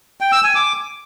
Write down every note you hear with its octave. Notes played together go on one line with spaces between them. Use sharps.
G5
E6
G#5
D6